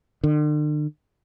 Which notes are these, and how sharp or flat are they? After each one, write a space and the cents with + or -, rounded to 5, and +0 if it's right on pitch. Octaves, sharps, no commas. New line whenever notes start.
D3 +40